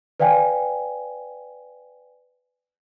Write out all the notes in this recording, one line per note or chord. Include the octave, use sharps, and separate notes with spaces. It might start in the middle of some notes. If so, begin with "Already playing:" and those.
B4 D5 F5 G5 G#5